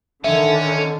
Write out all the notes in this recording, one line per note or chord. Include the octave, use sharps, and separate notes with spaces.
D3 D#3 C#4 E5